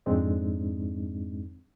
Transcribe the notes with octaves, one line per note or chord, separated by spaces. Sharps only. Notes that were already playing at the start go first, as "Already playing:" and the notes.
F2 G#2 G#3 C4 D4 D#4